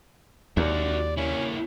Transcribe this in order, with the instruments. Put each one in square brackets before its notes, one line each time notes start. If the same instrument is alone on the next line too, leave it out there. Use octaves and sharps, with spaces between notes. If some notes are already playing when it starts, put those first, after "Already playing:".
[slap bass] D#2 [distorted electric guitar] F#4 E5 [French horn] D5
[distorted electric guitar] A#3 E4 [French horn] C#4